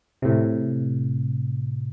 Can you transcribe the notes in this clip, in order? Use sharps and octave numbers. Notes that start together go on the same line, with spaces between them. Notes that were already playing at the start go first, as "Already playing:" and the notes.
A2 C3